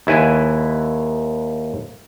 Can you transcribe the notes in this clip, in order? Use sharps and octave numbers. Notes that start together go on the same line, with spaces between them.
D#2 E4 B4 G#5